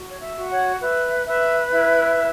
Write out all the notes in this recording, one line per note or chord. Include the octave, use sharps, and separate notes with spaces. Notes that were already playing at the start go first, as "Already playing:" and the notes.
Already playing: F#4
C#5
E5
F#4
C#5 F#5
B4 E5
B4 E5
E4 E5
E4